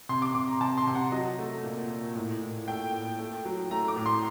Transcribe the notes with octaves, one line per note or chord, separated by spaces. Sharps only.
C3 C6
D6
C3 D6
A#5
C3 A5
C6
C3
F#5
F#3 D#5
A3
A#2
A#2
A2
A2
A3 G5
A2
A3
F#3
A3 A#5
D6
A2
C6